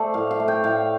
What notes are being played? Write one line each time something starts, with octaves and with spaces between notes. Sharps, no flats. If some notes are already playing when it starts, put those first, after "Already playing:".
Already playing: A3 A4 C5 D5
A2 F5
F5
A3
G5
A2 F5